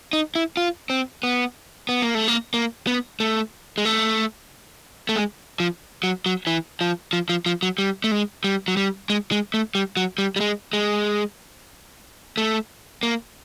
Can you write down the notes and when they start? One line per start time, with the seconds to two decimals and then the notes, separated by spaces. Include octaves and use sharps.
0.13 D#4
0.35 E4
0.57 F4
0.90 C4
1.23 B3
1.89 B3
2.02 A#3
2.15 A3
2.28 A#3
2.54 A#3
2.87 B3
3.20 A3
3.78 G#3
3.85 A3
5.09 A3
5.16 G#3
5.60 F3
6.03 F#3
6.26 F#3
6.47 E3
6.81 F3
7.13 F3
7.29 F3
7.46 F3
7.63 F#3
7.78 G3
8.04 A3
8.11 G#3
8.44 G3
8.68 F#3
8.77 G3
9.10 G#3
9.32 G#3
9.54 A3
9.75 G3
9.97 F#3
10.18 G3
10.36 G3
10.40 G#3
10.73 G#3
12.38 A3
13.03 A#3